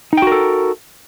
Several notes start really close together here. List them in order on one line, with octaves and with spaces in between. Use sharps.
D#4 G5 F#4 A#4 A4